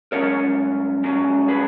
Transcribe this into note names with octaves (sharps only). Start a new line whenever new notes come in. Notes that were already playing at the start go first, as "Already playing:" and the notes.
G#2 F#3 C#4 A#4 C#5
G#2 F#3 C#4
G#4 B4